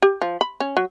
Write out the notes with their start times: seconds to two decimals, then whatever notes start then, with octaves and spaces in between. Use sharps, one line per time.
0.02 G4
0.22 F3
0.41 B5
0.60 C#4
0.77 F#3